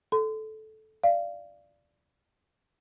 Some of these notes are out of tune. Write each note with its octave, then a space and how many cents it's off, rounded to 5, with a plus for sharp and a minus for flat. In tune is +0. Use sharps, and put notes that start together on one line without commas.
A4 -15 C6 -35
D5 +0 F5 -25